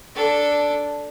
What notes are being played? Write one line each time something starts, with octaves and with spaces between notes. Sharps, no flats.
D4 A4